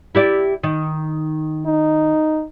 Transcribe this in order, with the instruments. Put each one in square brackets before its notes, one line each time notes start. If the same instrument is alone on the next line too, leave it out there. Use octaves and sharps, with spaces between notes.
[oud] E4 G4 D5
D#3
[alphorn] D#4